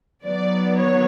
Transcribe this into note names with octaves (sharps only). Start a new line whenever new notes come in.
D#3 F#3 B3 D5
C#5